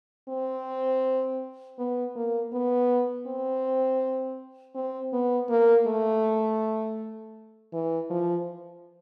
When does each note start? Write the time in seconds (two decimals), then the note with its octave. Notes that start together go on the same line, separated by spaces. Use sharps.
0.29 C4
1.79 B3
2.16 A#3
2.53 B3
3.27 C4
4.75 C4
5.13 B3
5.49 A#3
5.87 A3
7.73 E3
8.10 F3